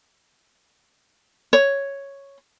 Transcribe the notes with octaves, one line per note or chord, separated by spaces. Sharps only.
C#5